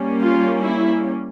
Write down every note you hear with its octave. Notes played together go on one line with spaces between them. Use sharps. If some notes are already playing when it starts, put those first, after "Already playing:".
Already playing: G3 A#3 C#4
F4
E4